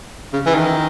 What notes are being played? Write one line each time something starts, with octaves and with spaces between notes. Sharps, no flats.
C#3
E3
D#3